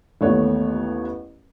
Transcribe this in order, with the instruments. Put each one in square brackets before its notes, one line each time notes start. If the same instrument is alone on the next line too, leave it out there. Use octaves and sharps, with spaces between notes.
[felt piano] A1 D#2 A3 B3 C#5